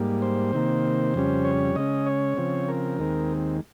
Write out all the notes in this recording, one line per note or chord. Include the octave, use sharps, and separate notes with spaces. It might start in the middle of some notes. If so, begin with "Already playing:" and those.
Already playing: G#2 G3 A#3
C5
C3 D#3 A#3
F2 C#3 G3 C#4
C#5
C#3 G#3 C#4 D#5
C#5
C#3 F3 C4
A#4
D#2 D#3 G#3 C4